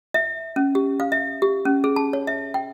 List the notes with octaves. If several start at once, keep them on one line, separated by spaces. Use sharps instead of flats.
E5
C#4
G4
F5
E5
G4
C#4
G#4
A5
C#5
E5
G5